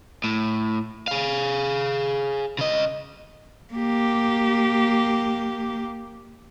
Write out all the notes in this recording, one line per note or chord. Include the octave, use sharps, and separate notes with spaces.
A2
G#4 F5
C#3 D#5
A#3 G4